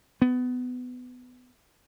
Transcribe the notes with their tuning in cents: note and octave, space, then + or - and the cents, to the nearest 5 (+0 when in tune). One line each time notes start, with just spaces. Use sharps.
B3 +20